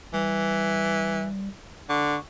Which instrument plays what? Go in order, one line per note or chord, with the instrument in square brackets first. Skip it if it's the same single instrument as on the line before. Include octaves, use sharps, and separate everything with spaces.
[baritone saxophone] E3 [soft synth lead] G3
[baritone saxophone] D3 [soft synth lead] C#6